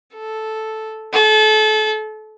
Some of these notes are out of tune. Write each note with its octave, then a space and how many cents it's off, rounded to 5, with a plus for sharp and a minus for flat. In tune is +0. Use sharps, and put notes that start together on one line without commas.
A4 -5
A4 -30